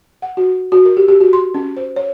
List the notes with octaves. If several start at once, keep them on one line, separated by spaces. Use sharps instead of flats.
F#5
F#4
F#4
A#4
G4
G4
F#4
C6
C#4
C5
C#5